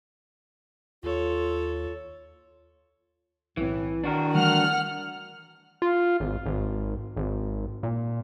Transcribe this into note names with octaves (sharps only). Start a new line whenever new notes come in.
D#2 F4 A4 C#5
B1 A2 E3 C4
D#3 D4 F#4 A#4
E3 G3 A3 F#5 F6
F4
G#1
G#1
G#1
A#2